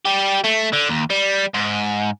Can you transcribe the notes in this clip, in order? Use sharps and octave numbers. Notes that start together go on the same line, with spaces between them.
G3 G4
A3
D3
D#2
G3
G#2